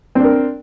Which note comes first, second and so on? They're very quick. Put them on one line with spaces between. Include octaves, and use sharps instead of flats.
C4 D4 A#4